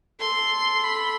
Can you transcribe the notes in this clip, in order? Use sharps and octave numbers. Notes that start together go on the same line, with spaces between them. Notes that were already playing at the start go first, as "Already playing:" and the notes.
A4 C6
B5